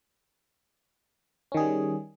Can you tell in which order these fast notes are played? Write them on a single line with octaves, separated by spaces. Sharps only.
C#4 D#3 G#4 G3